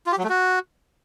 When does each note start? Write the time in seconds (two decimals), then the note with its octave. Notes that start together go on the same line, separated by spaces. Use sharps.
0.07 F4
0.12 G4
0.18 F#3
0.24 A3
0.29 F#4